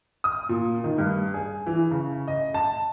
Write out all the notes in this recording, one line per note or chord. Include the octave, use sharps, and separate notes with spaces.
D#6
A#2
D#3
G2
G#4
E3
C#3
D#5
A5